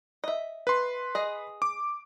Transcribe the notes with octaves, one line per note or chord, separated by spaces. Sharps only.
D#5 E5
B4 C6
G#4 D#5
D6